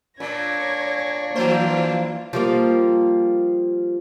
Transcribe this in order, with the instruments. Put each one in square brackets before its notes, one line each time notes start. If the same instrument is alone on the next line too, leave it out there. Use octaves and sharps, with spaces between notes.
[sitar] A#2 [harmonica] D4 [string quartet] C#5 G#6 A#6
[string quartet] E3 F4 [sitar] F3 C5 [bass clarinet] A#3
[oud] F3 G3 A#3